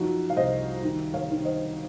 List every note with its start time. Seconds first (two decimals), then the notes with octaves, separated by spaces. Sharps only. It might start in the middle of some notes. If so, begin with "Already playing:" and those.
Already playing: F#2 F3 D#4 F#4
0.30 F5
0.36 C2 C5 D#5
0.83 D#3
1.14 C#5 F5
1.31 D#3
1.45 C5 D#5